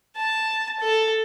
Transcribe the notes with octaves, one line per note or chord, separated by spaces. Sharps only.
A5
A4